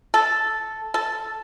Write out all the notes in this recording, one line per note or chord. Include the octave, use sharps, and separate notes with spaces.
A4
A4